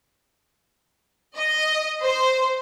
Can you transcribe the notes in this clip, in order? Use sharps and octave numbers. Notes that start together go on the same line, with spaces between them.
D#5
C5